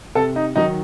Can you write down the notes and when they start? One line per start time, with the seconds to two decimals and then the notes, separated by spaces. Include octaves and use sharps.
0.15 C3 A4
0.36 D#4
0.55 D#3 F#3 D#4